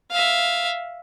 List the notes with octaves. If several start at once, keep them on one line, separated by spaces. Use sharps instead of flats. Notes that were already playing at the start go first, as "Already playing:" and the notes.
E5 F5